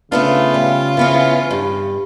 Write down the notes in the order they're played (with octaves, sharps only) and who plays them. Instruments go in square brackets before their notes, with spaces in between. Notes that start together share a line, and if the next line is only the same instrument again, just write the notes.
[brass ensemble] C#3 [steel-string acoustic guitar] A3 B3 D4 [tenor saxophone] F4
[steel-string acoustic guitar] G3
E3 B3 C#4
G2